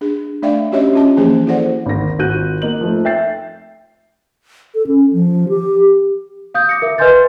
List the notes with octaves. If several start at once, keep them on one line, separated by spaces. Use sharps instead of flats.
D4 G#4
A3 D4 D5 E5 F5 G5
C#4 F#4 G4 C#5 D#5 E5
C#4 F4 A5
E3 F3 A#3 C#4 G#4 C5
E4 F#4 A4 C5 D5 F#5
G#1 D2 A#6
G#1 F4 F#4 F#6 G6 D#7
A#3 D#4 F#7
F3 A3
E5 G5 G6 A6 C7
A4
C#4
F3
G4
F5 D#6 G6
D6 A#6 C#7
A#4 E5
B4 D#5 G#5 C6 G6 A6